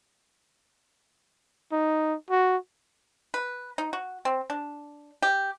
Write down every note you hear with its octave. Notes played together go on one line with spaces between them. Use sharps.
D#4
F#4
B4
D#4
F#4
C4
D4
G4